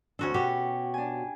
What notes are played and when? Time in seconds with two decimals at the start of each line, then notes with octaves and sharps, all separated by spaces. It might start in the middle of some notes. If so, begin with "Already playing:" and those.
0.19 D2 C#4 D4 F#4 A4
0.34 B2 F#4 G4 C#5
0.94 D4 G#5